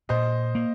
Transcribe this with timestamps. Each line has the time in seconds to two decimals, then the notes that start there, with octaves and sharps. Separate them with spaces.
0.09 A#2 C5 D#5
0.55 A#3